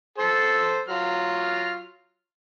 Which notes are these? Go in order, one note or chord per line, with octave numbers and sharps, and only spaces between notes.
A4 C5
F#3 F4 F6